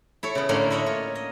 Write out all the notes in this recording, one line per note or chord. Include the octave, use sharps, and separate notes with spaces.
E4 A4 C#5
C#3 B3
A2 D3 A#3 C#4 C#5 C6
E4 A#4 C#5 D#5 E5 F#5
F4
D#5